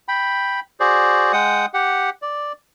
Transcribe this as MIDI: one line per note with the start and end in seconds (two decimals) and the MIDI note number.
0.08 0.60 79
0.08 0.60 83
0.80 1.32 66
0.80 1.32 68
0.80 1.32 72
0.80 1.32 74
1.33 1.66 56
1.33 1.66 78
1.33 1.66 79
1.33 1.66 87
1.74 2.10 67
1.74 2.10 78
2.22 2.52 74